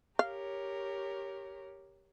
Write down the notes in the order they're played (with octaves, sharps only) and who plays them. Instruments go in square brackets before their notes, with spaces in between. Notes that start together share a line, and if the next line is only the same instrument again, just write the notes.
[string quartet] G4 A#4 C#5 [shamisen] F5